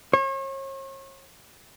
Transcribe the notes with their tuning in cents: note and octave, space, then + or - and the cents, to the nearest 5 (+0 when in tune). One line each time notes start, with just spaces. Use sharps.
C#5 -40